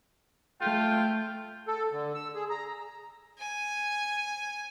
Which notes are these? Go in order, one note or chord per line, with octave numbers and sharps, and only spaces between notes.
A3 F4 G5
A4
D3
E6
G#4
A#5
G#5